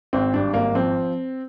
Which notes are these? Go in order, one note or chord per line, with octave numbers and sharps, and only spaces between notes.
G#1 C4
G2 D4
G#1 A#3
F3 C4